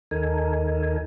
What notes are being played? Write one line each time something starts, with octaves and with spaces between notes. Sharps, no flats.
D#2 D#4 A4 A#4 G#5